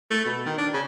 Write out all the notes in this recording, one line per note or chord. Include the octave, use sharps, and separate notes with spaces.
A3
B2
D#3
D4
C#3